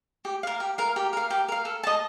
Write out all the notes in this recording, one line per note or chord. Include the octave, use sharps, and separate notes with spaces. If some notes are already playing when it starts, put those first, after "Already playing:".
G4
A#4 F5
G4
A#4 F5
G4
A#4 F5
G4
A#4 F5
A4
D#5 A5